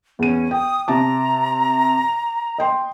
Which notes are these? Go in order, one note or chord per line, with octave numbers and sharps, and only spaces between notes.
E2 C#4 D#7
G5 D#6
C3 A5 A#5 D6
D#5 G5 C6